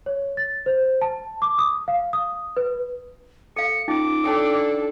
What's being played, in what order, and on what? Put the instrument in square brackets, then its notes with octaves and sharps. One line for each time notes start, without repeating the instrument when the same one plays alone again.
[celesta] C#5
A6
C5
A5
D6
D#6
F5
D#6
B4
[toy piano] A4 F5 [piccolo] C#7
[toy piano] C#4 D#4 F4 [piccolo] D6
[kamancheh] D4 A4 [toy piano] C#5 G5 D#6
[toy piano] D5 C6